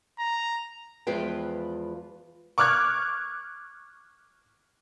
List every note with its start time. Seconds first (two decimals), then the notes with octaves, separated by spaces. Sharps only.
0.19 A#5
1.07 E2 F3 G#3 F4 B4 G5
2.58 C#6 D6 F6 F#6 G#6